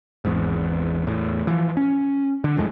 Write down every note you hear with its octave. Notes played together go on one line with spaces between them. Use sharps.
G#1 E2 G#2
E2 A2
E3 F3
C#4
D3
D1 F2 A2 G#3